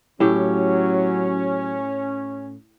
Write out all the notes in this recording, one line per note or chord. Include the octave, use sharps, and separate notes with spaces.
A2 F#3 C#4 G4